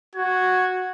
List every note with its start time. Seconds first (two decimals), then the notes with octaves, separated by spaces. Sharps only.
0.16 F#4 G#6